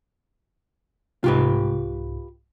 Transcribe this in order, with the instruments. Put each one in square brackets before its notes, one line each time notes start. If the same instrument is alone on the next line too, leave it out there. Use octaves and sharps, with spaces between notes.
[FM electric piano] C2 G#2 [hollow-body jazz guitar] F4 G4 B4